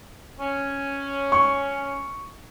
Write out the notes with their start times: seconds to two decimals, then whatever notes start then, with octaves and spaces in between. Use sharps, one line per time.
0.39 C#4
1.32 C#6